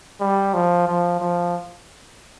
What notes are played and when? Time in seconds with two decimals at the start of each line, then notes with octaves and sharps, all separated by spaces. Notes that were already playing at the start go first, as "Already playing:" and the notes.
0.21 G3
0.54 F3
0.88 F3
1.20 F3